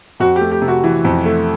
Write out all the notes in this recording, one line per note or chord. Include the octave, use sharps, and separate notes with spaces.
F2 F#4
A3 G4
G4
C3
F#4
E3
F2
A3